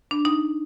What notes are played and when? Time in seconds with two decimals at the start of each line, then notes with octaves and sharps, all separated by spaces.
0.11 D4
0.25 D#4